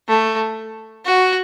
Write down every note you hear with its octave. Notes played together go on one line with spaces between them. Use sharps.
A3
F#4